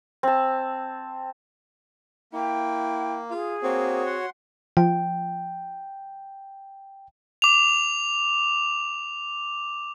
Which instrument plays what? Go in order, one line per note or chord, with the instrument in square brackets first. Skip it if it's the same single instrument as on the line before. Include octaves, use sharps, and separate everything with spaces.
[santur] C4 A5
[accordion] A#3 [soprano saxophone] E4 [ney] G5
[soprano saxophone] F4 [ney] G#4
[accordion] A#3 [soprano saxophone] C4 [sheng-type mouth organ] F#4 C#5
[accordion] F#5 C6
[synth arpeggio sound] F3 [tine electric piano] G5
[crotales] D6 F7